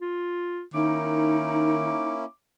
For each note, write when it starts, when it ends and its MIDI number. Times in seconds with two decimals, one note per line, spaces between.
0.01 0.62 65
0.74 1.95 51
0.74 2.25 58
0.74 2.25 61
0.74 2.12 63
0.74 2.25 64
0.74 2.30 86